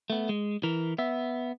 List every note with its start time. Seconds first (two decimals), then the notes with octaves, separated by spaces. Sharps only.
0.10 A3 B3
0.29 G#3
0.63 E3 A#4
0.98 B3 E5